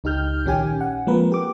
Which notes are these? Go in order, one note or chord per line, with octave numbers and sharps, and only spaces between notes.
C#2 D#4 G4 F6 G6
A#1 D#3 C#4 G4 G#5
F#5
F3 G#3 A#3 C4 A#4 B4
G4 D6